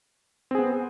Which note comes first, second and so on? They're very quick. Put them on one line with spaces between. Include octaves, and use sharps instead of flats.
C4 G#4 B3